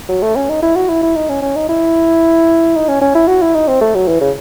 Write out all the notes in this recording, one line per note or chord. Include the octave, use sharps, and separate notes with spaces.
F#3
A3
C#4
D#4
E4
F#4
E4
E4
D#4
C#4
C#4
D#4
E4
D#4
C#4
C#4
E4
F#4
E4
D#4
C4
A3
F#3
E3
C#3